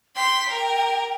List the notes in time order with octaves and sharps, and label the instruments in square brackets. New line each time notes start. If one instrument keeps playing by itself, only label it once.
[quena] G5 [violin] C6 B6
[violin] A#4